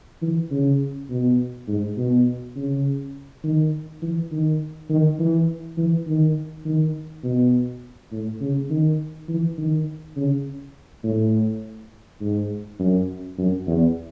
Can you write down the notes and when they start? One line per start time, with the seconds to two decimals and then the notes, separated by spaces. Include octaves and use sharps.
0.22 E3
0.51 C#3
1.10 B2
1.68 G#2
1.98 B2
2.56 C#3
3.44 D#3
4.02 E3
4.32 D#3
4.90 D#3
5.20 E3
5.78 E3
6.07 D#3
6.66 D#3
7.24 B2
8.12 A2
8.41 C#3
8.70 D#3
9.29 E3
9.58 D#3
10.17 C#3
11.04 A2
12.21 G#2
12.79 F#2
13.38 F#2
13.68 E2